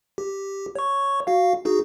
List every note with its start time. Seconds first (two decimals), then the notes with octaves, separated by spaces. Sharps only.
0.18 G4
0.75 C#5 C#6
1.27 F#4 F5
1.65 D#4 F#4 G#4